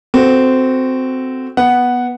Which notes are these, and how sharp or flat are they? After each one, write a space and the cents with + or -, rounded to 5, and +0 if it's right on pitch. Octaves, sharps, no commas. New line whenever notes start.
C4 -15 F#4 -5 A4 +0
B3 -10 F#5 +0